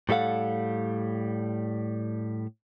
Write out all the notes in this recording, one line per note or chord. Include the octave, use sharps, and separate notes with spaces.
A2 G3 A4 F5 F#5